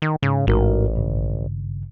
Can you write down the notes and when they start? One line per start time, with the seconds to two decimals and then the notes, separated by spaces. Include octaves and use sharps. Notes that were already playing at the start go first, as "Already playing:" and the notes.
0.02 D#3
0.23 G#2 C#3
0.47 A1 G#2 F#4 A#4
0.95 G#1 G2 C#3